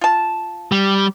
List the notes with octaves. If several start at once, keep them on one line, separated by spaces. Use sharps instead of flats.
F4 A5
G3